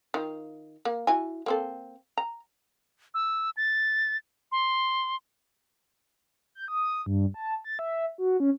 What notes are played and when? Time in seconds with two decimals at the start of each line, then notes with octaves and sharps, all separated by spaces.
0.14 D#3 F4
0.85 A#3
1.07 E4 F#4 G#5
1.46 A#3 C4 A4
2.18 A#5
3.14 E6
3.57 A6
4.52 C6
6.55 G6
6.68 D#6
7.06 G2
7.34 A5
7.64 A6
7.79 E5
8.18 F#4
8.40 C#4